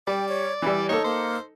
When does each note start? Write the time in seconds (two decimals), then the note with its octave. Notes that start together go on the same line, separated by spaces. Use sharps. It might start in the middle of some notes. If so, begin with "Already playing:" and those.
0.07 G3 D5 G5
0.28 C#5
0.62 E3 G3 E4
0.89 A#3 D#4 A4 C#5
1.04 A#3 C5